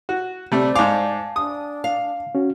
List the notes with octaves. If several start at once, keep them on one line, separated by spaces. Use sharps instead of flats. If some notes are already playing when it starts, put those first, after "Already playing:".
F#4
C3 G3 A3 C4 C5 D5
G#2 F5 G#5 A5 D6
D4 D#6
F5
C#4 F#4